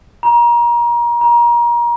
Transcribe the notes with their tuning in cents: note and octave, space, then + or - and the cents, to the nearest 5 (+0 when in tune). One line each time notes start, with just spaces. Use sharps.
A#5 +30
A#5 +30